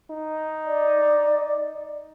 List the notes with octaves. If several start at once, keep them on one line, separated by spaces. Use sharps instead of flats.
D#4
D5